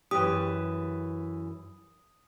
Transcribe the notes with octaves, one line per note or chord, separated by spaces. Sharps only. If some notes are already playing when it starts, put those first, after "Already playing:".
F#2 E3 G4 D#6